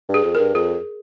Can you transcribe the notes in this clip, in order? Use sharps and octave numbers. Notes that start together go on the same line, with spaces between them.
G2
G#4
F2
G2 A#4
F2 G#4